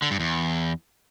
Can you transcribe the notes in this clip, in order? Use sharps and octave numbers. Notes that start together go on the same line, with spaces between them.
D3
G2
E2